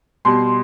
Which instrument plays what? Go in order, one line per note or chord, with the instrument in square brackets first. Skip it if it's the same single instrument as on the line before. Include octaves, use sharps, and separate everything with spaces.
[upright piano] B2 G3 C6